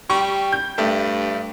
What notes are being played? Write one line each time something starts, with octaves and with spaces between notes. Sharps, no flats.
G3 C#6
G6
G2 A3